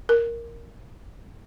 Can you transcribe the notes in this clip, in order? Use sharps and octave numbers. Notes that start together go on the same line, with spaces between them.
A#4